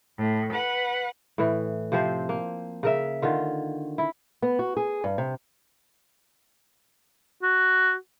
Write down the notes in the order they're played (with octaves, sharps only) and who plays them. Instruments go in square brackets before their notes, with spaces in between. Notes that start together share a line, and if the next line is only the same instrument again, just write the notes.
[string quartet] A2
B4 F#5
[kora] A2 E3
C3 F3 C4 C5
A#3
C#3 A#4 E5
D3 D#3 F4
E4
[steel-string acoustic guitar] B3
F#4
G#4
G2
C3
[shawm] F#4